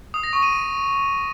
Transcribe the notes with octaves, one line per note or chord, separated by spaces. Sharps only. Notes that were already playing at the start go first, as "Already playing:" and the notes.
D#6
A#6
C#6
D#7